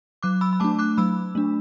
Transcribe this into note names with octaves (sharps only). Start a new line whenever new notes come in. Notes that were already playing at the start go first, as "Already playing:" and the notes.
F#3 D6 F#6
B5 E6
B5
A3 D4 A5 D6
D6 F#6
F#3 B5 E6
A3 D4